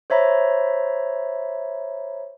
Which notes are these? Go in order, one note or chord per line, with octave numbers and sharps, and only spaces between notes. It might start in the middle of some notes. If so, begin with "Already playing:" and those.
C5 C#5 E5 A#5 B5